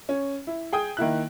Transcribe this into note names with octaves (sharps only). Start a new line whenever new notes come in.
C#4
E4
G#4 G5 D#6
D#3 A#3 E4 F#6